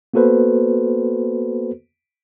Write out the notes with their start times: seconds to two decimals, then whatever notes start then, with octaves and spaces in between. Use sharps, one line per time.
0.14 A#3 B3 F#4 A4 B4 C5